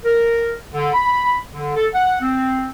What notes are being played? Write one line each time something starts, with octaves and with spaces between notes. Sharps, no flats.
A#4
D3
B5
D3
A4
F#5
C4